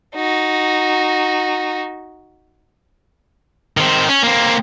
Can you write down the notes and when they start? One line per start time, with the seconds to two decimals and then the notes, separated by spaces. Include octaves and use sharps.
0.15 D#4 F#4
3.77 D#3 C4
4.08 C#4
4.23 A#3 C4